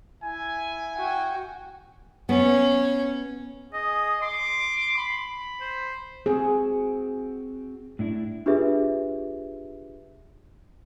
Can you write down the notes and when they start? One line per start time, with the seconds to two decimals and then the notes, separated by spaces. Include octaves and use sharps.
0.23 E4 E5 G#5
0.96 F#4 G5
2.29 B3 C#4
3.73 G#4 D#5
4.22 C6 D6
4.97 B5
5.61 C5
6.26 C4 F#4 G#4
7.99 A2 D4 E4
8.46 D4 F4 G4 G#4 B4 E5